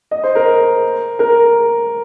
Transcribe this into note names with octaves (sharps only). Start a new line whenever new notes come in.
D#5
C5
A#4
A#4